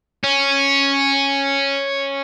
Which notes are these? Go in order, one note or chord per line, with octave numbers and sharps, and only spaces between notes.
C#4